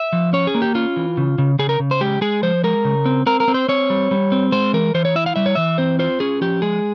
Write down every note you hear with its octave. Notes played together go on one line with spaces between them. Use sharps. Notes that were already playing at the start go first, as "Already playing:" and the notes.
Already playing: E5
F3
C#4 C#5
G#4
A#3
G4
C#4 F4
E3
C#3
C#3
C#3 G#4
A#4
C#3
C5
G#3 G4
G#3 G#4
F3 C5
G#3 A#4
C#3
C4
C4 A#4
A#4
C4
C5
C4 C#5
G3
G3
C4
G#3 C5
E3 A#4
E3 C5
C#5
E4 E5
F5
G3 E5
C#5
E3 E5
C4 C5
F4 C5
C#4 G#4
F3 G4
G#3 G#4